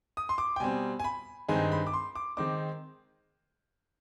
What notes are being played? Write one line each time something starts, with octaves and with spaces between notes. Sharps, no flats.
D#6
C6
D6
G5
B2 G3 C4 G#5
G#5
B5
G2 D#3 G#3 C4 D#4 G#5
B5
D6
C6
D6
D#3 G#3 C4 D#4 D6